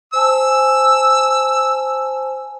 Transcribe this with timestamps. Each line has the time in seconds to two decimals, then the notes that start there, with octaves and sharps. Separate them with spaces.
0.13 C5 G#5 A5 E6